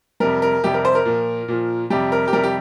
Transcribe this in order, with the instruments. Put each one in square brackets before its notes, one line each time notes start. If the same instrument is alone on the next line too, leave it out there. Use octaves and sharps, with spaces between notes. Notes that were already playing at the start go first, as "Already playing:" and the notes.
[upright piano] F2 C3 G3 A#4
A#4
F2 C3 G3 G4
A#4
C5
A#4
A#2 F3
A#2 F3
F2 C3 G3 G4
A#4
G4
F2 C3 G3 A#4
G4